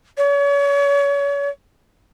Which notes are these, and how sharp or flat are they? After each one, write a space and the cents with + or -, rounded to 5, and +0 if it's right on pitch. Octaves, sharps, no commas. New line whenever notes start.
C#5 +35